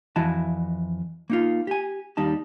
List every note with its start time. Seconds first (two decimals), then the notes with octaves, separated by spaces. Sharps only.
0.16 F2 E3 E4 F#4 D#5 A5
1.30 A#3 D#4 F4
1.67 G4 G#5
2.17 D#2 G3 D#4 A5